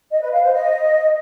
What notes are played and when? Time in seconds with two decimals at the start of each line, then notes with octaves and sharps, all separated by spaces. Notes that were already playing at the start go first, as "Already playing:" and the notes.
0.11 D#5
0.22 B4
0.32 F5
0.43 C5
0.53 D#5